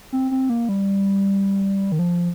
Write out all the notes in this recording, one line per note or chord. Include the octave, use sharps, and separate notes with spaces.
C4
C4
A#3
G3
D#3
F3